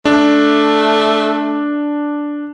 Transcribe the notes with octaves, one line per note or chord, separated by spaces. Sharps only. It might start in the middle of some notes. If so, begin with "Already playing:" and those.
A3 D4